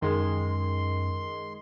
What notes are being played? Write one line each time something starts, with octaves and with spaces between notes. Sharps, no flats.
F#2 D#3 G#3 C6